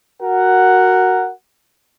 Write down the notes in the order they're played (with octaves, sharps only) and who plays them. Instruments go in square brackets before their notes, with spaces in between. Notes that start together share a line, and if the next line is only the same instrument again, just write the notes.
[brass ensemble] F#4 A#4 F#5